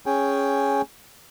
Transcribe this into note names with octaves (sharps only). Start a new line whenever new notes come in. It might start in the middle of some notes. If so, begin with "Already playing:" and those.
C#4 G#4 G5